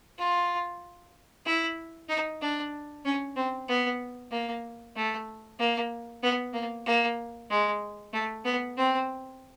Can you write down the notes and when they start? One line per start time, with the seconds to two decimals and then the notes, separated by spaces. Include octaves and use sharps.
0.18 F4
1.46 E4
2.09 D#4
2.41 D4
3.05 C#4
3.36 C4
3.68 B3
4.31 A#3
4.96 A3
5.59 A#3
6.23 B3
6.54 A#3
6.86 A#3
7.50 G#3
8.13 A3
8.45 B3
8.77 C4